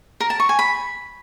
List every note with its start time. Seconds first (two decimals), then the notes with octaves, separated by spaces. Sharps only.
0.20 A#4
0.30 A5
0.40 C#6
0.49 G#5
0.59 B5